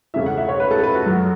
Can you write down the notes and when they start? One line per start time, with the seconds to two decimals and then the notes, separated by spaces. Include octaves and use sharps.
0.14 E2 C#3 A3 C#4 E5
0.26 F#5
0.37 E5
0.49 C#5
0.60 B4
0.71 A4
0.83 B4
0.95 F#4
1.06 F#2 F#3 A3